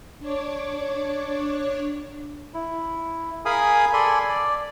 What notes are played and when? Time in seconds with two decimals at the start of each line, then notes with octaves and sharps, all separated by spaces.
0.20 D4 C#5 D6
2.54 E4
3.45 G#4 A#4 F5 G#5 B5 D#6
3.93 A4 D5 G#5 B5 C6
4.29 D5